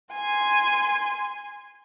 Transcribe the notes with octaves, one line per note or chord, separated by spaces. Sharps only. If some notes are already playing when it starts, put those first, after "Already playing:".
G#5 C6